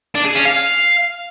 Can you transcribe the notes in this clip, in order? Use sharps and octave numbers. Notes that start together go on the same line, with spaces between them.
D4
G#4
C#4
F5